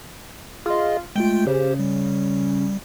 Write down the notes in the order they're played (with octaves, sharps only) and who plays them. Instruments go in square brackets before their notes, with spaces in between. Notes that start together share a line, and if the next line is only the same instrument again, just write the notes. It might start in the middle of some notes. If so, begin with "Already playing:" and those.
[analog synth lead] F4 [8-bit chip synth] G#4 D#5
[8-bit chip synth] G#3 A3 F4 [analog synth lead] G5
[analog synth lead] C#3 [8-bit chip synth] G4 C5
[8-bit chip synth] G3